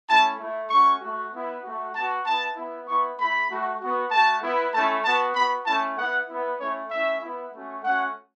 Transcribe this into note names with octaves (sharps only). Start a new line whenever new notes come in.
A3 C#4 E4 A5
A3 E4
A3 C#4 F#4 C#6
A3 F#4
B3 E4
A3 F#4
B3 F#4 A5
B3 E4 A5
B3 E4
B3 E4 C#6
A3 E4 B5
A3 F#4
B3 F#4
A3 F#4 A5
B3 E4
A3 C#4 E4 A5
B3 F#4 A5
B3 F#4 B5
A3 C#4 E4 A5
B3 E4 F#5
B3 E4
A3 C#4 E4 C#5
A3 C#4 E4 E5
B3 E4
A3 C#4 F#4
A3 C#4 F#4 F#5